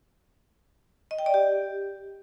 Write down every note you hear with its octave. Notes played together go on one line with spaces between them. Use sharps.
D#5
G5
D5
G4